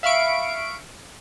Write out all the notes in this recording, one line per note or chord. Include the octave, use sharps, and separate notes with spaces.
E5 F5 B5 C#6 D7